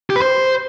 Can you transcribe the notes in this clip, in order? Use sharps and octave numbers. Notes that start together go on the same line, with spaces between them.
G4
B4
C5